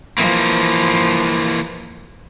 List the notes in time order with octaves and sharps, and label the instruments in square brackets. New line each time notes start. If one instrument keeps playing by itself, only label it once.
[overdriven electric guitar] E3 A#3 [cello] F3